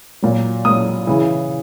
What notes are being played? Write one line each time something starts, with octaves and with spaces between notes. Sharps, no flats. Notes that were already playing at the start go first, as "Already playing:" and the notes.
A#2 F#3
A#2 F#3 D#6
C#3 E3